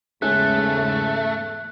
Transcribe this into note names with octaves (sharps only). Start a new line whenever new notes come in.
E2 G#2 C#3 G#3 A3 C#4 F#6